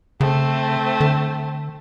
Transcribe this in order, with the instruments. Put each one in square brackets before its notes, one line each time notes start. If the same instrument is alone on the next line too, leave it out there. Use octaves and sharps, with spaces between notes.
[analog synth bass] C#3 [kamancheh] A3 C4
[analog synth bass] D3